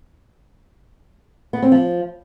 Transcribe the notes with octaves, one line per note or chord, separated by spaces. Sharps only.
B3
C4
F3